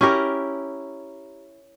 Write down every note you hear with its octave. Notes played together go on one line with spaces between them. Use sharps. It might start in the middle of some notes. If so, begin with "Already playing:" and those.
C#4 E4 G4 A#4